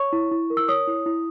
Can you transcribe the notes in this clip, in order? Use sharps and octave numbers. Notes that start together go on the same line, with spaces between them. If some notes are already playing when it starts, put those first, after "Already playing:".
Already playing: C#5 C#6
E4
E4
A#4
E6
C#5 D#6
E4
E4